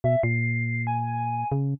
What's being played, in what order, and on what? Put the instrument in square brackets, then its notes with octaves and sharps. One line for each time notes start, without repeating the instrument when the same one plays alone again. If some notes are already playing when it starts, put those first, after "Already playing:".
[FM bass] B2 [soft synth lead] E5
[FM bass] A#2 [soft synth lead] C7
[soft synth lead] G#5
[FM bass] C#3